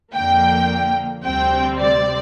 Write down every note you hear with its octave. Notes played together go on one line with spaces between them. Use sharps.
F2 D3 A#3 G5
D2 C3 G3 C4 G5
D5